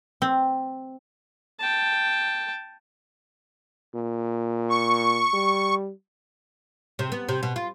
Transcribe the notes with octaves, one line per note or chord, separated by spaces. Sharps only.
C4
G5 A5
A#2
C#6
G3
C3
B3
C3
B2
F4